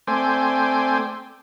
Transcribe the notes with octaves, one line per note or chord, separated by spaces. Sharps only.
A3 C4 C5 D5 G5 G#5